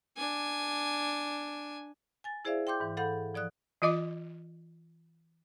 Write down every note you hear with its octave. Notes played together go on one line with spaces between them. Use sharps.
D4 G#5
G#5 A6
E4 G#4 C5 D5 E5 F5
G5 C6 D6 G6
G#2 E3
A4 F5 F#5 B5 G6
F3 D5 D#6 F#6
E3 F4 D#5 D6